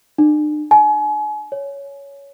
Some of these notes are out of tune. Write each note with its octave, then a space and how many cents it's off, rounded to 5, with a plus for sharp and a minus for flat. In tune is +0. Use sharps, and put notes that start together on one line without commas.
D4 +45
G#5 +35
C#5 +10